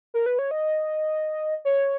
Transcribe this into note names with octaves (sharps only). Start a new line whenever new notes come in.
A#4
B4
C#5
D#5
C#5